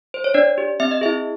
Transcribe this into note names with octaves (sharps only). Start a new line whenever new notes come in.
C5
C#5
D4 D5
G4
C4 E5
D#5
E4 G#4 E5